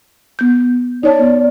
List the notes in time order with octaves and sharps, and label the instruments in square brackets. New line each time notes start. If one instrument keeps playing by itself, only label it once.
[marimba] B3 G6
[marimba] D#4 C#5 A5 [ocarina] D5
[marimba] B3